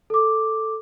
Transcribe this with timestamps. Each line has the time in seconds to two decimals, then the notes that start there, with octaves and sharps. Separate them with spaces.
0.10 A4 D6